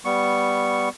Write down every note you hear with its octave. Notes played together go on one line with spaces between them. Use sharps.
G3 B3 C#6